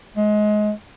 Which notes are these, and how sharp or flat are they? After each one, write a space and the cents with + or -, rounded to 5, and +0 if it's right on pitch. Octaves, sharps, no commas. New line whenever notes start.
G#3 +25